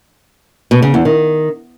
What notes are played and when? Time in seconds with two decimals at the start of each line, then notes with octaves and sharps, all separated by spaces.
0.71 B2
0.82 C#3
0.94 E2
1.05 D#3